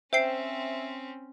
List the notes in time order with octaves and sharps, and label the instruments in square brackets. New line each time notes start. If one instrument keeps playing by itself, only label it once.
[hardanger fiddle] C4 C#4 [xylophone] C5 G5 C7 [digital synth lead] E5